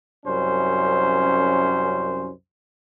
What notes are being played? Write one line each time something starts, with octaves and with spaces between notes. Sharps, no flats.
C2 F#2 C#4 C5